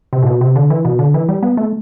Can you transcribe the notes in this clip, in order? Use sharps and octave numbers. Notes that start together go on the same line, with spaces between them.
C3
A2
B2
C3
D3
E3
B2
D3
E3
G3
B3
A3